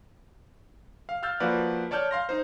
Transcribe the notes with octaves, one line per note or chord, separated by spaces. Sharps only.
F5
F5 E6 F6 G6 A6
F3 A#3 F#4 B4 D5 F5
C#5 D5 A5 F6 G6
F5 C6 A#6
D#4 C5